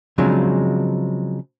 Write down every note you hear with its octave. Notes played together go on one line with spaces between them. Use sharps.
C#3 F3 F#3 G#3 C4 D4